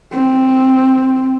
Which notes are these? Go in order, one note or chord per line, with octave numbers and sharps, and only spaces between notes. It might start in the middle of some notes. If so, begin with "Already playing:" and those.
C4